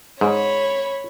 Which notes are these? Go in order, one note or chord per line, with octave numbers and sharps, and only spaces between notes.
G#2 C#5 B5